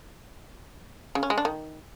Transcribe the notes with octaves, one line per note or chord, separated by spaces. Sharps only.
C#3
C#4
G#3
D4
D#3